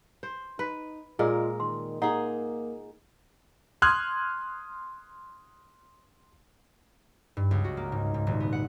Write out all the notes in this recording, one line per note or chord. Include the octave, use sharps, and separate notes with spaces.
C5
D#4 B4
A#2 G#3 F4 G#4 A#4 D#5
D#3 C6
A#3 D#4 G#4 F#5
C6 D#6 F6 F#6 G#6
G2
C#2
F#4
A#3
G#2
G#2
D#1
B3
F#5